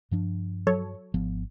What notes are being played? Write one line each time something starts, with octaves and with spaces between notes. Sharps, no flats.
G2 F3 D4
F#3 A4 C#5
G#1 F3 B3